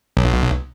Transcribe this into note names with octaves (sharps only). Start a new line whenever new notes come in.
B1